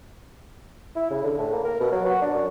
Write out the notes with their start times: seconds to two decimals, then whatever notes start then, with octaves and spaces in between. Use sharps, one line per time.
0.96 E4
1.10 C#3
1.24 D3
1.39 A2
1.53 A#3
1.64 A#4
1.80 B2
1.92 F#3
2.06 F#4
2.22 D4
2.34 F#2